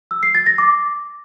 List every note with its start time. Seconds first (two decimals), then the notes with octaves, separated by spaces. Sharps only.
0.11 E6
0.23 C7
0.35 A6
0.46 A#6
0.58 D6